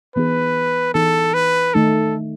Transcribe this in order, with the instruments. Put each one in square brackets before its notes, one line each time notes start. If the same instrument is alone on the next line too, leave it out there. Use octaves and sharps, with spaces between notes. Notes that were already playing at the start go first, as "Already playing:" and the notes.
[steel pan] E3 B3 D#4 G#4 [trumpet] B4
[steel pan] E3 B3 D#4 G#4 [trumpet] A4
[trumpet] B4
[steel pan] D#3 A3 D#4 [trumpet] A4